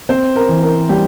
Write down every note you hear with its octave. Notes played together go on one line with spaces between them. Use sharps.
C4 C5
A#4
E3
A#4
G3 G4